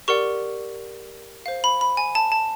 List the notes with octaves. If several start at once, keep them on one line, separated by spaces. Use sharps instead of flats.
G4 A#4 D5 F#5 C#6
C5 F5
B5
B5
G#5
A5
A5